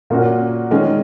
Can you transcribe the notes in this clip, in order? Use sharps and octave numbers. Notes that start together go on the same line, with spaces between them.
A#2 A#3 C#4 F#4 A#4
D#3 G#3 C#4 G#4